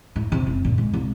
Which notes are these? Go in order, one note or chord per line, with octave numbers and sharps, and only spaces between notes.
A2
C3
F#1
A#2
G#3
C2